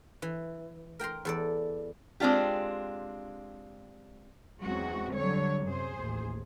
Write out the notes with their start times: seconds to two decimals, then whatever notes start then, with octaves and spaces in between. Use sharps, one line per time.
0.22 E3
0.99 A#4 G5 A#5 C6
1.25 E2 A4 D5
2.20 G#3 C4 D4 F4 G4
4.61 E2 F#3 G#3 C4 C#4 F#4
5.14 D3 F#3 G3 C#5
5.66 F#2 C3 G#4 C5
5.99 A1 D#2